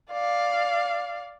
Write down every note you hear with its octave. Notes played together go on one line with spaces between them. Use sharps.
D5 F5